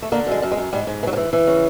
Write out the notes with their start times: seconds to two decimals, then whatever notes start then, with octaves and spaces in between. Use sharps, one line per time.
0.02 A3
0.12 D3 A#3
0.27 F#2 G#3
0.42 F#2
0.52 G#3
0.57 F#2
0.73 G#2 G3
0.87 G#2
1.03 E3
1.07 F#3
1.13 F3
1.17 E3
1.33 E3
1.47 C#3